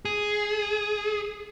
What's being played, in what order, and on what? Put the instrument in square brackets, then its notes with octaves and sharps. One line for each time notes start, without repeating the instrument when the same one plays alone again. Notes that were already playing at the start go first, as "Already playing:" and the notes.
[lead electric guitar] G#4